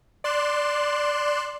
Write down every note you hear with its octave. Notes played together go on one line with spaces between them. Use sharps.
D5 C6 F#6 E7